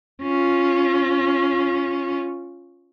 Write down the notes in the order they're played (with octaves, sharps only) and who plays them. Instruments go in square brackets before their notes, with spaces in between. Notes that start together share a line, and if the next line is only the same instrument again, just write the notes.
[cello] C#4 F4